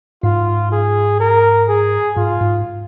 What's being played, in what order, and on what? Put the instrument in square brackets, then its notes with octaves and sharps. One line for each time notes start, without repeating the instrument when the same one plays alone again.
[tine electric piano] G#2 [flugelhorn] F4
[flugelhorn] G#4
A#4
G#4
[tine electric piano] G#2 [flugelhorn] F4
[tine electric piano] G#2